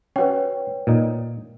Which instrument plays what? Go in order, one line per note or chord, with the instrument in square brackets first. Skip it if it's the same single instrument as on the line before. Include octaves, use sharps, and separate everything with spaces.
[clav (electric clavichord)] C#4 F#4 [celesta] B4 C#5 G5
[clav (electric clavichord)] A#2 D#4